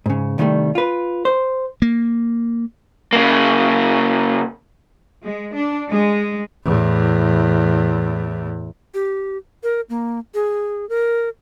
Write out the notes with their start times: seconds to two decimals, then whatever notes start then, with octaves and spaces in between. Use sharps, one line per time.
0.06 G#2 C#3
0.38 C2 D#3 F#3 G3 A3
0.75 F4 B4
1.25 C5
1.82 A#3
3.13 C#3 A#3
5.24 G#3
5.54 D4
5.89 G#3
6.64 E2 A2
8.94 G4
9.63 A#4
9.90 A#3
10.35 G#4
10.89 A#4